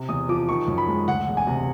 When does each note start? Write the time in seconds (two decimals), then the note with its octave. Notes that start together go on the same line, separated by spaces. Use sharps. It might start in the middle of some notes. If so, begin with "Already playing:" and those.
Already playing: C3
0.09 E2 D#6
0.29 F3 D6
0.48 D#3 C#6
0.68 F#2
0.78 B5
0.88 G#3
1.08 D2 F#5
1.27 E1
1.37 G#5
1.47 C3